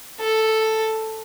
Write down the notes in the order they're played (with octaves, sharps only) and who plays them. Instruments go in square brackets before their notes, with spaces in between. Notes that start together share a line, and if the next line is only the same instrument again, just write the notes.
[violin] A4